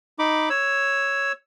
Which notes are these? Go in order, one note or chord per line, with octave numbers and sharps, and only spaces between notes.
D#4 B5 D6
C#5 E6